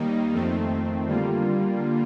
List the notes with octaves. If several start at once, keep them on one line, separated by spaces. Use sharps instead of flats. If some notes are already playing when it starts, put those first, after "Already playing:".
Already playing: D#2 D#3 G3 A#3 D#4
F2 D#3 A3 C4
D3 G3 A#3 F4